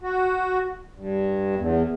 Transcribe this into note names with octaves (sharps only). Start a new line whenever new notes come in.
F#4
G2
E2